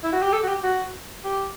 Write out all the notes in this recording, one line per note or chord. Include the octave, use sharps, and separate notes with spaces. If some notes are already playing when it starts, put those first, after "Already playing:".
E4
F#4
G4
A4
F#4
G4
F#4
G4